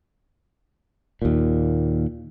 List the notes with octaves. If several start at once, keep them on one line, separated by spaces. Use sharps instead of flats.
D#2 A#2